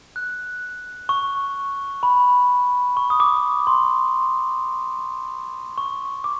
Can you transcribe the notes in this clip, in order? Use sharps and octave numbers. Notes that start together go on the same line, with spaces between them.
F#6
C#6
B5
C#6
D#6
D6
C6
C#6
D6